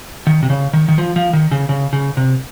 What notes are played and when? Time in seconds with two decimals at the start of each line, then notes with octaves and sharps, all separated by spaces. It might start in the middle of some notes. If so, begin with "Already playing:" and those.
0.27 D#3
0.43 C3
0.50 C#3
0.73 D#3
0.88 D#3
0.98 F3
1.16 F3
1.33 D#3
1.51 C#3
1.69 C#3
1.93 C#3
2.17 C3